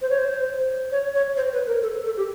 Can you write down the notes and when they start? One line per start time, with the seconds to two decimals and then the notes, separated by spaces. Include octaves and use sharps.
0.02 C5
0.10 C#5
0.18 C5
0.92 C#5
1.15 C#5
1.37 C5
1.53 B4
1.67 A#4
1.82 A4
2.05 A4
2.17 G4